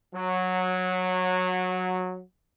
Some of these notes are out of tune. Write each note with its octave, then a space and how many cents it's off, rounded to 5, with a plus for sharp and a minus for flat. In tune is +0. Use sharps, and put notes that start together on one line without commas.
F#3 -15